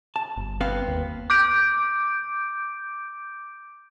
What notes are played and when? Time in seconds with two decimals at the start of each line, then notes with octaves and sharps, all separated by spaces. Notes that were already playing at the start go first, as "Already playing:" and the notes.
0.16 A5
0.37 G1
0.61 B3 C4 F5
0.88 D#2
1.30 D6 G6 D7